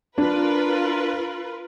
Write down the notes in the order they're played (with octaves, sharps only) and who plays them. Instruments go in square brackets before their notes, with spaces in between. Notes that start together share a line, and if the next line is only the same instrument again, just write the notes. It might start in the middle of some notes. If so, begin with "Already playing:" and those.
[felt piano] D4 [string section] F4 A#4 B4